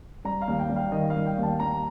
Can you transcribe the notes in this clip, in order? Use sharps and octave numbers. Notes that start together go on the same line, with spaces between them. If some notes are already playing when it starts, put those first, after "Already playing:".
G3 A#5
F5
D#2
G5
G3
F5
D#3 D#5
F5
G3
G5
D#2 A5
D#2 A#5